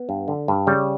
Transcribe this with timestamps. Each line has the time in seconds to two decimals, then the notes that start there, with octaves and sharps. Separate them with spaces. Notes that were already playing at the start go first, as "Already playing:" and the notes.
Already playing: B3
0.09 G2
0.28 D3
0.48 G2
0.67 C#3 G3